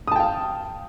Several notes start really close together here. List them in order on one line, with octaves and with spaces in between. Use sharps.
D#6 A5 G5 F5